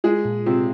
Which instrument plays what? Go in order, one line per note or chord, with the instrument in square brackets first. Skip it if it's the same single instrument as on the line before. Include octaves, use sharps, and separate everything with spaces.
[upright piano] G#3 G#4 [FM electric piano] F4
[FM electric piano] A#2
[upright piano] C3 C4 [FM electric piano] F4